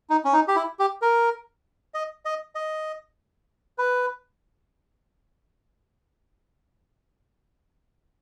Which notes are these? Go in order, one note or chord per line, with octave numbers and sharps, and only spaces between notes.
D#4
C#4
D#4
G4
E4
G4
A#4
D#5
D#5
D#5
B4